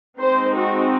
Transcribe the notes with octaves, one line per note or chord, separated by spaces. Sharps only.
G#3 C4 D#4 C5
F#4